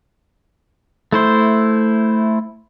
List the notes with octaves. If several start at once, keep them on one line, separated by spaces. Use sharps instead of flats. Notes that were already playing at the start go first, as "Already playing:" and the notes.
A3 E4 C5